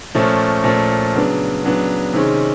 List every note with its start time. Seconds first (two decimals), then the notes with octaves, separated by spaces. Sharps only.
0.15 A#2 F3 A3 C#4
0.64 A#2 F3 A3 C#4
1.14 C#3 F#3 B3 D4
1.64 C#3 F#3 B3 D4
2.14 C3 D#3 G#3 C#4